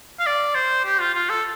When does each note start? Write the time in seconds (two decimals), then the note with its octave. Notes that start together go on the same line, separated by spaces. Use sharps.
0.20 F5
0.26 D5
0.55 C5
0.85 G4
1.00 F4
1.14 F4
1.30 A4